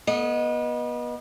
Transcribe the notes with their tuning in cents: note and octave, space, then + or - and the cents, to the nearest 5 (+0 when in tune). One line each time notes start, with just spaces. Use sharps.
B3 -30 D#5 +0